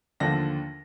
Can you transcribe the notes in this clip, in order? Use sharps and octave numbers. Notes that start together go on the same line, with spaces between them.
D#2 D3 F3 A#6